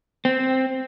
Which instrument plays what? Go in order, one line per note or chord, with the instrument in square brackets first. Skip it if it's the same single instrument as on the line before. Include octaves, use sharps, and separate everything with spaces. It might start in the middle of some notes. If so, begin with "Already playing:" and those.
[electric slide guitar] C4